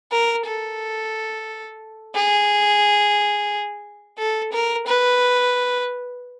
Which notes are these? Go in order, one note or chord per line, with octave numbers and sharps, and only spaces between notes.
A#4
A4
G#4
A4
A#4
B4